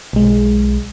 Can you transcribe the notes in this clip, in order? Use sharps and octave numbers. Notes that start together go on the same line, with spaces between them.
B1 G#3